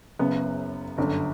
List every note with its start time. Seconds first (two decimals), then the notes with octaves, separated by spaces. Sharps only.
0.19 F#1 F#2 C#3 B3
0.98 G1 F#2 D3